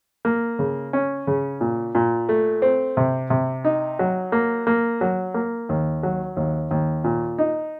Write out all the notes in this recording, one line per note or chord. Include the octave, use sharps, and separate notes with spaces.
A#3
C#3
C#4
C#3
A#2
A#2
A3
C4
C3
C3
D#4
F#3
A#3
A#3
F#3
A#3
D#2
F#3
D#2
D#2
A#2
D#4